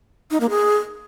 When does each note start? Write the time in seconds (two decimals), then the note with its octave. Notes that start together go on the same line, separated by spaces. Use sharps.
0.31 D#4
0.40 A#3
0.50 G#4